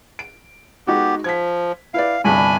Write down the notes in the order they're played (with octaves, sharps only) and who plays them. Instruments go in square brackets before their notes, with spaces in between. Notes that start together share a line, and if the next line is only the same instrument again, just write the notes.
[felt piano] D7
[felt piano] G#3 D#4 F#4 [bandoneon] B3 G4
[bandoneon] F3 [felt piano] G#6 B6
[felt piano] E4 B4 D5 [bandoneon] F5
[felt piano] G1 C2 G2 [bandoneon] D4 G#5 B5